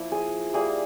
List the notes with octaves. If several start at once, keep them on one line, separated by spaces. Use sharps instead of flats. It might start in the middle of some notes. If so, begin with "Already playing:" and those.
Already playing: F3 A#3 E4
G#4
G3 A#3 E4 G#4